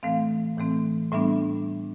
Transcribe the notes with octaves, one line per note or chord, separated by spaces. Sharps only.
A2 E3 A3 C4 F5
A2 E3 A3 C4
A2 G3 B3 D4 E5